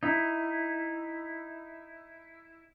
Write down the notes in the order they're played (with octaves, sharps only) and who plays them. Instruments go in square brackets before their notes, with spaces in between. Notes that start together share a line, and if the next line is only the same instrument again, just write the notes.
[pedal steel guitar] D#4 E4